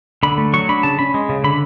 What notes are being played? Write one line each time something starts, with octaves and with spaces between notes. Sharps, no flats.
D3 B5
A3
F#3 C#6
D4 B5
C#3 A5
C#4 B5
G#3
C#3
D3 B5